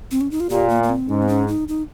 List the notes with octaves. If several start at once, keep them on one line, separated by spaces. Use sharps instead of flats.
C4
C#4
D#4
F4
A#2 G4
A#3
A#3
C4
G#2 C#4
C4
C#4
D#4
D#4